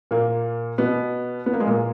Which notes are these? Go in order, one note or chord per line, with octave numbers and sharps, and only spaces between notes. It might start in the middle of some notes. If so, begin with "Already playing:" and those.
A#2 A#3
B2 B3
B3
A#3
G#3
A#2 A#3